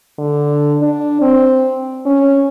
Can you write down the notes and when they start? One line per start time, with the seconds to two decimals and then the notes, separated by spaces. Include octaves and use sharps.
0.19 D3
0.82 D4
1.21 C4
2.06 C#4